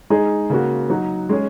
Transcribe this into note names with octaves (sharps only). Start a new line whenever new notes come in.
G#3 D#4 G#4
C#3 A#3 F#4
F#3 D#4 F#4
G#3 C#4 G#4